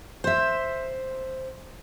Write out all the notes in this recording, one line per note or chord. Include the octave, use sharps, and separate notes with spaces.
C5 E5